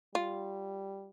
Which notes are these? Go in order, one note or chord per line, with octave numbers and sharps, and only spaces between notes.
G3 F4